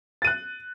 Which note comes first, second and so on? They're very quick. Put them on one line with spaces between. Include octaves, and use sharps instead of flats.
A6 D#7 F#6